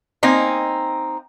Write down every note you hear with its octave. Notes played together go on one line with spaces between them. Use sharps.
A#3 C4 D#4 G#5